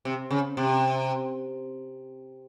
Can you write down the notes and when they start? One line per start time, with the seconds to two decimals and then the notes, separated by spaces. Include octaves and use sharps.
0.05 C3
0.31 C#3
0.57 C3